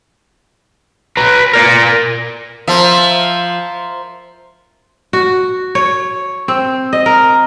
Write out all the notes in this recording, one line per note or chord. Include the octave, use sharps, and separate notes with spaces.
B4 A#5
A#4 D5
F3 A#4 C5 E5
F#4
C#5
C4
D#5
A#4